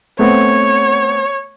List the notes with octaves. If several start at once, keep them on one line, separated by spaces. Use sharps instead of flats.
A3 B3 C4 C#5